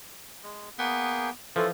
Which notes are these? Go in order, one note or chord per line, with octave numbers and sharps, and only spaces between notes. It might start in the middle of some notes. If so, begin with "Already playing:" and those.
G#3
A#3 B3 G#4 G5
E3 F3 C#4 F4 A4